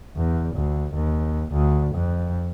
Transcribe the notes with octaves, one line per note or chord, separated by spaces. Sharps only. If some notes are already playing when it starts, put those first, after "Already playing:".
E2
D2
D#2
D2
F2